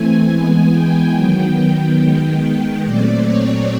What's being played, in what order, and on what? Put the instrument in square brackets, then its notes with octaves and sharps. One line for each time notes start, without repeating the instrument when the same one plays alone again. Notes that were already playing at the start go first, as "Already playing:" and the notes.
Already playing: [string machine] E3 A3 C4 G#5
E3 G#3 B3
G5
D#3 F#3 B3
D#3 G#3 B3 G5
A#2 F#3 A3 C4 D5
C#5